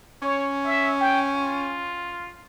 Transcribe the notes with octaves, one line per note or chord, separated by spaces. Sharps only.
C#4 C#5
E5
G5
F4